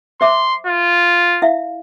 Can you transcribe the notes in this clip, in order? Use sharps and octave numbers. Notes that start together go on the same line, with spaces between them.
C5 E5 C6 D6
F4
E4 E5 F5